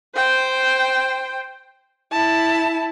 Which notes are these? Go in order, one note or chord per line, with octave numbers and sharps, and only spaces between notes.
C5 G5
E4 A5